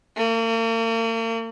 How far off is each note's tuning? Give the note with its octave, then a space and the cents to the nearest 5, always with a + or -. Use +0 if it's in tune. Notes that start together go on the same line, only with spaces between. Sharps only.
A#3 -40